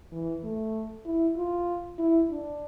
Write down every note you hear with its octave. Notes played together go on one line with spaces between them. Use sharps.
E3
A3
E4
F4
E4
D4